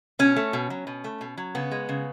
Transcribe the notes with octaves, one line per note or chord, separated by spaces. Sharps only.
B2 C#4
A3
B2
F#3
B2
A3
B2
F#3
C#3 B3
G#3
C#3